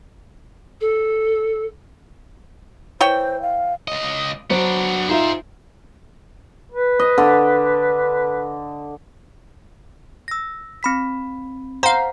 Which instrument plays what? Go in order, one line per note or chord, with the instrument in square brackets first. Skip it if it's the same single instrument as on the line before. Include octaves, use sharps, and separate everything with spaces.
[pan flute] A4
[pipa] E3 C#5 G5 [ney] C5
[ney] F5
[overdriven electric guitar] C#2 D#5
[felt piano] F#3 F#4 C5 [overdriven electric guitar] B3 D4
[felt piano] D#4 F4 E5 [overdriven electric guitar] G#4 C5
[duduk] B4
[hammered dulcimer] D#5
D3
[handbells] E6 A#6
C4 B5 B6
[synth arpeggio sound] C5 F5 [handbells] F#5 [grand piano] A#5